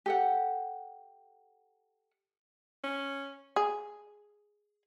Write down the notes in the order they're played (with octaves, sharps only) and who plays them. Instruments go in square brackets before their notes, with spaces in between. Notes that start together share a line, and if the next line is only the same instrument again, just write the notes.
[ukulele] G4 A4 F#5
[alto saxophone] C#4
[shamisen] G#4